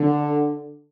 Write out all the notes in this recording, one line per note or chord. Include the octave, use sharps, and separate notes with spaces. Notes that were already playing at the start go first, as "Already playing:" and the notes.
Already playing: D3